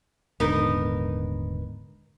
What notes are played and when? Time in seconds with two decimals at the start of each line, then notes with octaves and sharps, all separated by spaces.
0.40 D#1 G#2 D3 B3 D#4 A#4